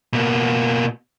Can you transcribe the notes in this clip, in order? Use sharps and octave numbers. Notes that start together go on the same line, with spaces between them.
B2 A#3